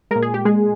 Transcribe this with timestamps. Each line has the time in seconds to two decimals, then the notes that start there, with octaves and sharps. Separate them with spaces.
0.11 A#2 G#3 A#4
0.23 G#4
0.34 G4
0.45 G#3 G#4